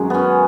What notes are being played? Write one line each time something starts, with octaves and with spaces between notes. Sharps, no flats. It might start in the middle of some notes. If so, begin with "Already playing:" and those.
Already playing: F#2 D#3 F#3 G#3
B3 C#4